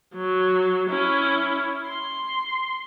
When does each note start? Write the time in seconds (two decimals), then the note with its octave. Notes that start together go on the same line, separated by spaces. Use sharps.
0.14 F#3
0.90 C#4 E4
1.88 C6